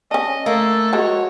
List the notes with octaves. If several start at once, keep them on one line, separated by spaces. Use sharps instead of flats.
C#4 D4 D#5
A3 A#3 A4
F3 G#3 F#4 C#5